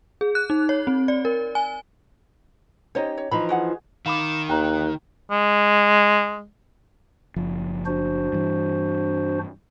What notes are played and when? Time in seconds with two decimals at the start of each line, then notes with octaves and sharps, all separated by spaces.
0.21 G#4
0.35 F#6
0.50 D#4
0.69 C#5
0.87 C4
1.08 D5
1.25 A#4
1.55 G#5
2.95 C#4 D#4 G4 C5 C#5 D#5
3.17 C#5
3.31 E3 F3 D#4 B5
3.49 F#4 G#4 F#5
4.06 D#3 F5 B5 D6 E7
4.49 D#2 G5 A#5 F#6
5.31 G#3
7.36 F#1 F3
7.86 D4 F#4 C5
8.33 G2 E3